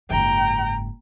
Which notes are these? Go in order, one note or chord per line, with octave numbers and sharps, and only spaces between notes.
F#1 G#2 G5 A#5